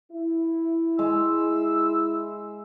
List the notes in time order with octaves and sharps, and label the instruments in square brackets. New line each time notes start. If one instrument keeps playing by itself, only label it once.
[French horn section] E4
[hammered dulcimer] G#3 [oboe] E6